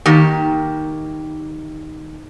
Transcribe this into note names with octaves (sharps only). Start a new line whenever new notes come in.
D#3 A#3 G4